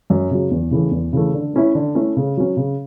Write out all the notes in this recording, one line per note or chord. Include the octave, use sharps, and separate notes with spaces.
F#2
C#3 F#3
E2
C#3 E3 A3
E2
C#3 E3 A3
D3
A3 C#4 E4
D3
A3 C#4 E4
C#3
F#3 C#4
C#3